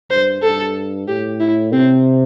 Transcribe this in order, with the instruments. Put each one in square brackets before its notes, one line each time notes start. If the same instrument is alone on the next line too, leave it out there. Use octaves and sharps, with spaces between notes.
[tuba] G2 [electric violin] C5
[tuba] G2 [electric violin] A4
[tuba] A2 [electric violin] G4
[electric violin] E4
[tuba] C3 [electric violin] C4